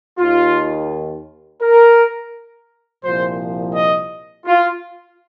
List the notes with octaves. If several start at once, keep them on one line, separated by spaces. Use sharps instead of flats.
D#2 D#3 F4
A#4
C2 A#2 F3 C5
D#5
F4